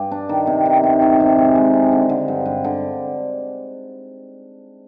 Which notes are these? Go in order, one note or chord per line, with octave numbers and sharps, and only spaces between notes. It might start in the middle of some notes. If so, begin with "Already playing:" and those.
Already playing: G2 G3
D4
D#3
C3
D#3
C3
D#3
C3
G#3
G#3
C3
D3
D3
G2
G2
D3